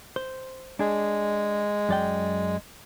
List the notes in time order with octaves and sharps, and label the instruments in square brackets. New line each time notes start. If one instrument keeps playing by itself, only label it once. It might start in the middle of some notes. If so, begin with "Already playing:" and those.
[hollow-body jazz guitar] C5
[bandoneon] G#3 [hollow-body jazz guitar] D4 G#4
[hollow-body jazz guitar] F#2 D5 G5